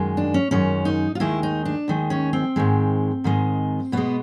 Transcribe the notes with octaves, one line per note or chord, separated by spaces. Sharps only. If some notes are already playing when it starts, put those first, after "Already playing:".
Already playing: F#2 D#3 G#3
D4
C#4
F#2 D#3 G#3 C#4
D#4
F4
D#2 D#3 G#3 E4
D#4
D4
D#2 D#3 G#3
C#4
C4
G#2 D#3 G#3
G#2 D#3 G#3
B2 G#3 B3